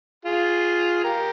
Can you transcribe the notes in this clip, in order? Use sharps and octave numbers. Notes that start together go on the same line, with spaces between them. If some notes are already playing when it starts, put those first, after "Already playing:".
F4 G#4
G4 A#4